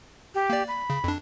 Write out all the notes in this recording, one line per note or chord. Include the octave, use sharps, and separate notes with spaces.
G4
A#3 D5
B5
C#3
F2 D4